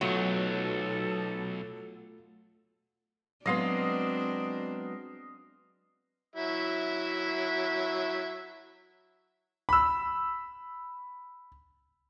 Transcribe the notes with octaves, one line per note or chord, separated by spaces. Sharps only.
B1 F#3 A3 F4 A4
F#3 G#3 B3 C4 D4 D#5 F5 C6
F#3 E4 E5
B5 E6